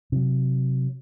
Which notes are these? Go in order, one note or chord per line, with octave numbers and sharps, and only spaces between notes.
C3 F#3